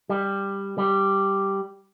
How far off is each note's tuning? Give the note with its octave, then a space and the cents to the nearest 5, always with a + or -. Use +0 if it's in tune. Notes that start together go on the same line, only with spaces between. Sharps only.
G3 +10
G3 -5